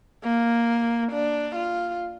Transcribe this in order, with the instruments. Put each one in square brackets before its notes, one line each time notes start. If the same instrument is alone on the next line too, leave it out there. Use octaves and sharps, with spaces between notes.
[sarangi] A#3
D4
F4